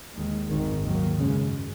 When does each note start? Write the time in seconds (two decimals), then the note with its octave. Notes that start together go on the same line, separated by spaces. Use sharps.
0.16 D#2 D#3 G#3
0.49 G#1 F#2 D#3
0.83 D#2 D#3 F#3 A#3
1.17 F#2 C#3 G#3 C#4